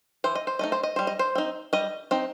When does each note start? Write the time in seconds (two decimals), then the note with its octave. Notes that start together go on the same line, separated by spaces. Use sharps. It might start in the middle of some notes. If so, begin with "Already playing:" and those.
0.24 E3 C5
0.35 D#5
0.47 C5
0.59 A3 D#4 D#5
0.72 C5
0.83 D#5
0.96 G3 C5
1.07 D#5
1.19 C5
1.35 C4 D#4
1.73 G3 D#5
2.11 C4 D#4